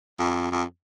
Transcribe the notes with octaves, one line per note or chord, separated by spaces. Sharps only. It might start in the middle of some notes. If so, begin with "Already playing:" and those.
F2
F2